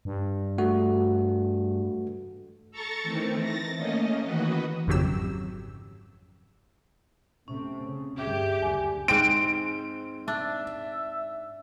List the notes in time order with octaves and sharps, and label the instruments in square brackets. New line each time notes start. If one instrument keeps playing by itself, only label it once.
[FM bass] G2
[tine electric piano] A3 F#4
[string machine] A4 A#5 C#6 A6 C#7
D#3 E3 A3 C4
A6 A#6
A3 A#3 C#4 D#5
D#3 E3 F#4 B4 D#5
[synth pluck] G#1 F2 C#3 F#3 G4 E6
[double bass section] C3 A3 C4 [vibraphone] C#4
[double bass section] C#3
[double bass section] D2 G2 [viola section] G4 [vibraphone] G#4 E5
[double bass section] F#1 D2 D3 [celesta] G#5
[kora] G#2 C4 [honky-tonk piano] D7
[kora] D4 [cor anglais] E5